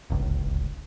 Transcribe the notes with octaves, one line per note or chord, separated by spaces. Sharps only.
D1 G1 C#2